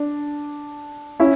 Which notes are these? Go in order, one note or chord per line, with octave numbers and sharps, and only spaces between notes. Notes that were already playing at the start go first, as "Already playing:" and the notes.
Already playing: D4
C#4 E4